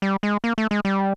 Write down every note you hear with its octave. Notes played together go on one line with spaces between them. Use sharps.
G3
G#3
A#3
A3
G#3
G3